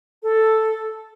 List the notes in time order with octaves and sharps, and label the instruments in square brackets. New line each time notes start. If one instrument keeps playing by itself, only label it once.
[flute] A4